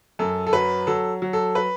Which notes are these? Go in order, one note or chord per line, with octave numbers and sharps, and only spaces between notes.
F#2 A4
A4
F#3 B4
F#3 A4
F#3
A4
B4